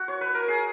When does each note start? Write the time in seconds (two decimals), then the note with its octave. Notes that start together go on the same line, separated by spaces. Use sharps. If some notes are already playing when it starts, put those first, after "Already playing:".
Already playing: F#4
0.08 C#5
0.21 B4
0.35 A#4
0.48 G#4